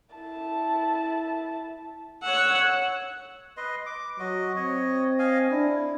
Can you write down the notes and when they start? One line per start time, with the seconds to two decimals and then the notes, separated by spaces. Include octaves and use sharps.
0.15 E4 A5
2.24 C#5 F#5 E6 F#6
3.57 B4 D#5 C6
3.86 D6
4.19 F#3 F#4 D#5
4.56 C4 C#5 D#5
5.19 D#5 F5 G#5
5.51 D4 E4